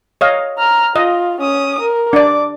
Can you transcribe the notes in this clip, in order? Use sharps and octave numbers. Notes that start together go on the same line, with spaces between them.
C#5 D#5 F5
A#5 F6
F4 D#5
C#4 D#6
A#4
D4 D5 D6